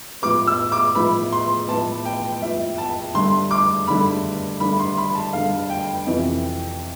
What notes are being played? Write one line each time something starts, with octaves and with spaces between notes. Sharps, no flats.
A2 F3 B3 D6
E6
D6
A2 F3 B3 B5
C6
A2 F3 B3 A5
G5
A2 F3 B3 E5
A5
G2 D3 A3 C6
D6
G2 D3 A3 B5
G2 D3 A3 B5
C6
B5
A5
G2 D3 A3 F5
G5
F2 C3 E3